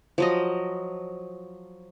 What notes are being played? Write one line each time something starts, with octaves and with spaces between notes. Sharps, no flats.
F3 F#3 D#5